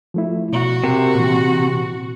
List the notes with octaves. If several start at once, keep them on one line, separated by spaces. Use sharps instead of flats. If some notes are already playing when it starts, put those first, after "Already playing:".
F3 A3 E4
B2 F#4
C3 A#4
A#2 E3